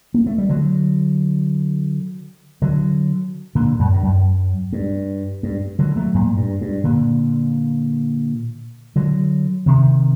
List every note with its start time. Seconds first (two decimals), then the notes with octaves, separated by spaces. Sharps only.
0.14 A#3
0.26 A3
0.38 G3
0.49 D3 F#3
2.62 D3 F#3
3.55 A#2 D3
3.79 F#2
3.94 G2
4.03 F#2
4.73 G2
5.43 G2
5.79 D3 F#3
5.96 F#3 A3
6.14 G2 A#2
6.37 G2
6.61 G2
6.84 A#2 D3
8.96 D3 F#3
9.66 C3 D#3